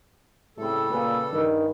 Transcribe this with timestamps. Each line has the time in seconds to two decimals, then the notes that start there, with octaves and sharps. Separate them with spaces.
0.58 A2 C#3 G3 A3 C4 A4
0.91 A#2 G#4 B4
1.33 G2 D#3